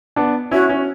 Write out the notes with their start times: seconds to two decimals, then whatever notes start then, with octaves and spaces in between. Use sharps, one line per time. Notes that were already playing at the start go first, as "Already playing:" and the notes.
0.16 B3 D4
0.51 C#4 E4 F#4
0.69 C#4